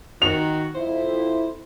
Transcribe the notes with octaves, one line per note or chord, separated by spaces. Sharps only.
D#3 F#4 F7
F2 E4 C5